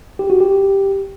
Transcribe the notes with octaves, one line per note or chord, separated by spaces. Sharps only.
G4
F#4
G4